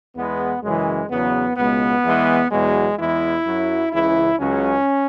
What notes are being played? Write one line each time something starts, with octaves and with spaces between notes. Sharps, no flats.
E2 E3 G#3 B3
F#2 C#3 E3 G#3
E2 C#3 F#3 B3
C#2 B2 G#3 B3
E2 E3 G#3
E2 B2 F#3 G#3
E2 E3 G#3 E4
F#2 F#3
C#2 C#3 E3 E4
C#2 C#3 F#3 C#4